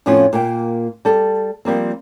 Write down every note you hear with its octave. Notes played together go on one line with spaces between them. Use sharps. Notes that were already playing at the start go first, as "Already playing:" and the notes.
F2 A2 F3 B3 C#4 F4
A#2 A#3 G5
G3 A4
F3 G3 A#3 C4